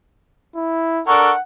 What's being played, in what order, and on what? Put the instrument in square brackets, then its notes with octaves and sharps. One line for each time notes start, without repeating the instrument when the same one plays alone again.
[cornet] E4
[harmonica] D4 A4 A#4 [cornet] F#5 [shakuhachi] C#6